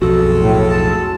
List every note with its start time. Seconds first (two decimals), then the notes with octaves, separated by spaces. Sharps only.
0.02 B1 F2 G#3 F4 F#4 A4
0.39 A2
0.69 A5